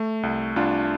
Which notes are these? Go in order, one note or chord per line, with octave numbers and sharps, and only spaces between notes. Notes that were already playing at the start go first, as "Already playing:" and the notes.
Already playing: A3
C2
C2 D4 F4